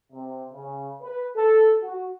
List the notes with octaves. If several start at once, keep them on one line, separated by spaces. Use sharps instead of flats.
C3
C#3
B4
A4
F#4